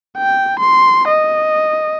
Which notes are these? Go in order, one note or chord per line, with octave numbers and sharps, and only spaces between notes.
G5
C6
D#5